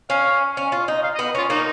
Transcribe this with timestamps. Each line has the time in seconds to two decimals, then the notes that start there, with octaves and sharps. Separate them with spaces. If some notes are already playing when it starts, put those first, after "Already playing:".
0.10 C#4 F5
0.57 C#4
0.72 F4
0.88 D#4
1.04 F5
1.15 D#5
1.19 B3
1.35 C#4 F4
1.50 A#3 D#4